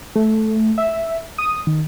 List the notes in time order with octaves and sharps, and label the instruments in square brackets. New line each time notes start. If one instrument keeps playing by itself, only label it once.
[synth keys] A3
E5
D#6
D#3